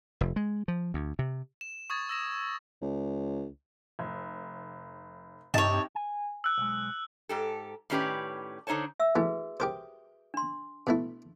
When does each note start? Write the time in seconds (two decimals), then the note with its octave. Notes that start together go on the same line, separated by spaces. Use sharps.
0.21 F1
0.36 G#3
0.68 F3
0.94 D2
1.19 C3
1.61 E7
1.90 C#6 D#6 G#6 A6
2.09 E6 A#6 E7
2.82 C#2
3.99 F1
5.54 G2 C3 D#4 C#5 A5
5.95 G#5
6.44 E6 F#6
6.58 B1 G#3
7.29 G#2 G4 A4
7.90 A2 D#3 C#4 G4 B4 D5
8.67 D3 D#4 C5 C#5 A5
9.00 E5 E6
9.16 E3 A3 F#4 G#4 B4
9.60 G4 A#4 C5 D#6
10.34 D4 C6
10.87 B2 A3 E4